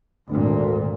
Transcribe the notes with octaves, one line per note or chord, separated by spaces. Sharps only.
G#1 D2 A#2